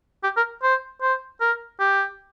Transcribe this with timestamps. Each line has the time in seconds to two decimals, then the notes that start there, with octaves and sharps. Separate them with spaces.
0.24 G4
0.37 A#4
0.63 C5
1.02 C5
1.41 A#4
1.80 G4